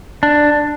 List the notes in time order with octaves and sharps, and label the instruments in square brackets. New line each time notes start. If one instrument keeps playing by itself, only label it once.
[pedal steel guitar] D4